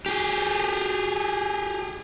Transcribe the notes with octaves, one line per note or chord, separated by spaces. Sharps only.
G4 G#4